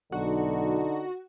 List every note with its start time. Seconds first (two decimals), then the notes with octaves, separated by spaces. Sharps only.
0.12 B1 D3 D#4 F#4